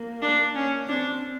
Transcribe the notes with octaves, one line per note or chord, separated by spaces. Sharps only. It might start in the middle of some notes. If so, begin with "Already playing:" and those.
Already playing: A#3
D4
C#4
C4 D4